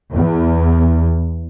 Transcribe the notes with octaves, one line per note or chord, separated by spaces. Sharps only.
E2